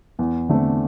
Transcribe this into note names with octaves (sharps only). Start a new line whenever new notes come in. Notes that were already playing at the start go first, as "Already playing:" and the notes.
E2
D3 A3 C4